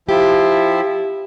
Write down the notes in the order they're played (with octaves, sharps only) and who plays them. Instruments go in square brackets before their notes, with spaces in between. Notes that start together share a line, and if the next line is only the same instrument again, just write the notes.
[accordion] F3 E4 [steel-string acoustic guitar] G4